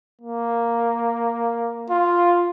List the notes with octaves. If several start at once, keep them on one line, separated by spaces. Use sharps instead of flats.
A#3
F4